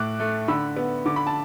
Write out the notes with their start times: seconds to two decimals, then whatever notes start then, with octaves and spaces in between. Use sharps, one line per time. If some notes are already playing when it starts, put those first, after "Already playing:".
Already playing: A2 D6 F#6
0.20 A3
0.48 D3 B5 E6
0.77 B3
1.06 D3 D6
1.16 B5
1.27 A5